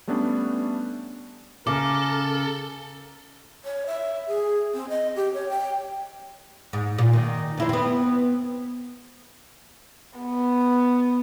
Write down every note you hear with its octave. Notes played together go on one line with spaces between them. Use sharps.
G3 A3 B3 C#4 D4
C#3 A4 A#4 D6
C#5
E5
G#4
C4
D#5
G4
C#5
G5
G#2
A#2
D#3
F2 E4 C5
B3 C4
B3